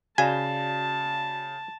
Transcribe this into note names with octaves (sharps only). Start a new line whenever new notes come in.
C#3 F#4 D5 F5 G#5 A5 E7